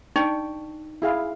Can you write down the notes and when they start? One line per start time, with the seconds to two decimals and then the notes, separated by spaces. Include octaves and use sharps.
0.16 D4 D#4 G5 C#6
1.02 E4 G#4 F5